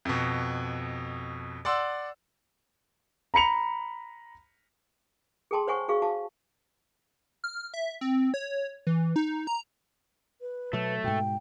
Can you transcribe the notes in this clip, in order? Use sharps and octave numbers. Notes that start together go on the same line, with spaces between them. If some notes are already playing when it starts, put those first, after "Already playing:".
F2 B2
D5 F#5 C6 E6
A#5 B5 C#7 F7
G#4 A4 G5 A5 C6
C5 C#5 F#5 G#5 C#6
F#4 G#4 F5 C#6
F#4 F5 A5
F6
E5
C4
C#5
E3
D#4
A#5
B4
B2 F#3 A3
G#2 B2 G5